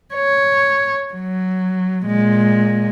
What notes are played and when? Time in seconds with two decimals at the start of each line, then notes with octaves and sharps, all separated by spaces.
0.14 C#5
1.14 F#3
2.06 A#2 G#3